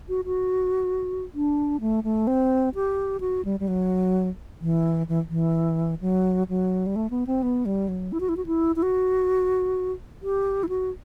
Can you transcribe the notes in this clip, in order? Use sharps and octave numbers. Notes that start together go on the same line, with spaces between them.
F#4
F#4
D4
A3
A3
C4
G4
F#4
G3
G3
F#3
E3
E3
E3
F#3
F#3
G3
A3
B3
C4
B3
G3
F#3
E4
F#4
E4
F#4
E4
E4
F#4
G4
E4
F#4